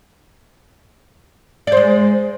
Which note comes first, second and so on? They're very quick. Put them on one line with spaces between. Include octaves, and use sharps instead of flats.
D5 C5 G#3